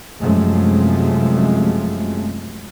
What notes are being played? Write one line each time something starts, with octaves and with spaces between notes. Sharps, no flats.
F#2 C3 F3 G#3 A3